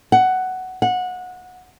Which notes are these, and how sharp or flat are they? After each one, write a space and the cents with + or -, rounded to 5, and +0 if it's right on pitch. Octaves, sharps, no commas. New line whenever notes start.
F#5 +10
F#5 -20